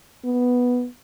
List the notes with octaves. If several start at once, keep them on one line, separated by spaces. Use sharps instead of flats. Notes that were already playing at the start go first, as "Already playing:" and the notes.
B3